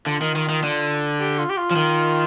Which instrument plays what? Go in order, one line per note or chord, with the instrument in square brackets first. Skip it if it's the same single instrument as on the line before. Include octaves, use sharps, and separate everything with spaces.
[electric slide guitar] D3 [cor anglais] F4
[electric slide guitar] D#3
D#3
D#3
D3
[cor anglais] G4
F4
G4
F4
[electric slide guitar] F3
D#3